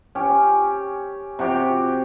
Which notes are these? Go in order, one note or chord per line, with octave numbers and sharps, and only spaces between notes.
C#4 G4
C3 F#4 G4